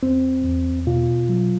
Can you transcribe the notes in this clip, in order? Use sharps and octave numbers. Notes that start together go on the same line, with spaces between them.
E2 C4
E2
B2 F4
F#3